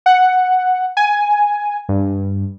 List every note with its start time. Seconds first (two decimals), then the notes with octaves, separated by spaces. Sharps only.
0.06 F#5
0.97 G#5
1.89 G2